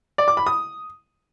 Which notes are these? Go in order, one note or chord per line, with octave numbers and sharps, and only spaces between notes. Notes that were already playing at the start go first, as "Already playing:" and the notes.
D5
D6
B5
D#6